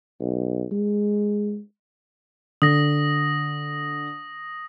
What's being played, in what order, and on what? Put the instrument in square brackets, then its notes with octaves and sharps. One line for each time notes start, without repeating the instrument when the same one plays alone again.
[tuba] B1
G#3
[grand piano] D3 [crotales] D#6 A#6